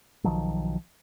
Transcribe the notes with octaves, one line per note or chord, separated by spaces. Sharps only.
B1 D#3 F3 F#3